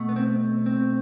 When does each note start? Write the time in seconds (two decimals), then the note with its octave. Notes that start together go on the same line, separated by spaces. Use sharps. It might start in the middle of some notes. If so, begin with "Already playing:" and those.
Already playing: B2 A3
0.09 B3
0.16 C4
0.66 C4